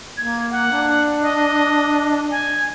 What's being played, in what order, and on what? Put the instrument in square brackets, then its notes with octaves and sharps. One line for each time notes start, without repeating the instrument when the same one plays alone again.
[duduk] A#3 [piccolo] G#6
[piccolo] F#5
[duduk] D4
[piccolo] D#5
G#5